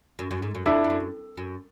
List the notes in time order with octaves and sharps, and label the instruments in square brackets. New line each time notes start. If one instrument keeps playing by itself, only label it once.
[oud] F#2
F#2
G#2
F#2
[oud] F2 [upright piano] D4 E4
[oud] F2
F#2
F#2